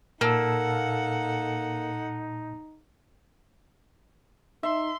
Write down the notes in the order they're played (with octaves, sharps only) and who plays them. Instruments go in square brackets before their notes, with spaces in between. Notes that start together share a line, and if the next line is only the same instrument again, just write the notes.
[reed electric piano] A#2 A5 E6 [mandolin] A#3 [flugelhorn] D#4 [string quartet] A4 F#5
[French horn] D#4 [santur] E5 [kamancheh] C6